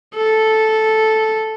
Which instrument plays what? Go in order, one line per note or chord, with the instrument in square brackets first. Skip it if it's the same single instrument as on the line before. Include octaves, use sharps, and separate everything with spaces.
[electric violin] A4